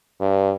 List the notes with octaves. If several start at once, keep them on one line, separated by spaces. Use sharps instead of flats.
G2